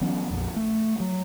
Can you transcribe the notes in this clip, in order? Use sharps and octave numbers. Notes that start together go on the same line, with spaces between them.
E3 F#3 B3 C#4
A#1 F2
A3
F#3